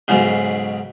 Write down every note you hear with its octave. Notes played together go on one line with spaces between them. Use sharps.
B1 G#2 C#3